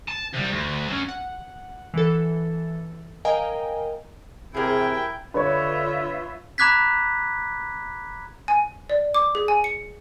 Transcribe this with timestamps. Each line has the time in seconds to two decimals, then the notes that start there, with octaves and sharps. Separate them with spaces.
0.09 A5
0.34 C3 G3
0.51 D2
0.88 F#3 C#4
1.09 F#5
1.94 E3 A4
3.25 A#4 D#5 F5 G5 G#5 A#5
4.55 C3 E4 G#4 A#4 G5
5.34 D3 F4 B4 C#5 E5
6.58 A#5 B5 D6 F#6 G#6 B6
8.48 G#5
8.90 D5
9.14 D6
9.35 G#4
9.48 G#5
9.64 C#7